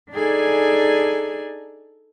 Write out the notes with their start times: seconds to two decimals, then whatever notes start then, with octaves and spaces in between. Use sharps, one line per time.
0.12 D4 D#4 G#4 A4 D5 G#5